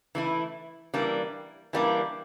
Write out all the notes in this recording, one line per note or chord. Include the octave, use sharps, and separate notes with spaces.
E3 A3 E4
E3 G3 A#3 D4
E3 G3 A#3 D4